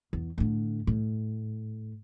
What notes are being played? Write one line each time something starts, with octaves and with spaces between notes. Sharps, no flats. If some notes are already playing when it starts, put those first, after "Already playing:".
E2
A2 D3
A2